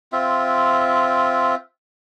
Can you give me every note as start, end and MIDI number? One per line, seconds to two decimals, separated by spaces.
0.12 1.55 60
0.12 1.55 65
0.12 1.55 76